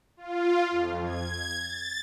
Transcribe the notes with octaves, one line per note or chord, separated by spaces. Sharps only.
F4
F2
G#6
A6